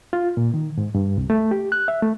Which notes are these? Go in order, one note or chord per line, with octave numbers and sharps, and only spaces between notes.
F4
A#2
D#3
G#2
G2
C2
A3
G4
F#6
E5
A3